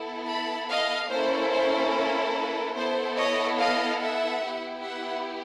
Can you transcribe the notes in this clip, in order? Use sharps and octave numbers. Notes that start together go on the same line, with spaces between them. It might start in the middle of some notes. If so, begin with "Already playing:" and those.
Already playing: B3 E4 A4
A5 B5
D#5 F5
A#3 C#4 E4 A4 C5
C5
C5
B4
B3 E4 A4 C5
C#5 D#5
D#5 F5
E5 F#5
B3 E4 G4
E5 F#5